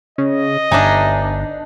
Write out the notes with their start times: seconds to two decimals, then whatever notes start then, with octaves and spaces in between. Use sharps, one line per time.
0.18 C#3 D#5
0.71 G1 D4 D#4 E5 G#5